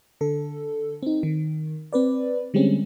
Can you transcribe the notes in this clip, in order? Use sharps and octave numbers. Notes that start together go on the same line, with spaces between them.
D3 A4
C4 D#4
D#3
C4 B4 D5
D3 G3 G#3 C4 C#4